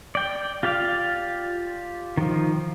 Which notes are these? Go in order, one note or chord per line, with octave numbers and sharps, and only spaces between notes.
D5 G5
F4 G4 D5 F5
D#3 F3